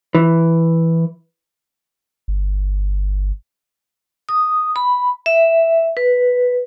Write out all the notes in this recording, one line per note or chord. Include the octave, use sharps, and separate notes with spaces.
E3
G1
D#6
B5
E5
B4